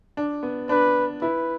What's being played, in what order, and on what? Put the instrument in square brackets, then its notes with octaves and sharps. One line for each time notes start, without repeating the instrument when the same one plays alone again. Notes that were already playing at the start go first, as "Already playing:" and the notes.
[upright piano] D4
B3
[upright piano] D4 [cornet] B4
[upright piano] E4 [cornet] B4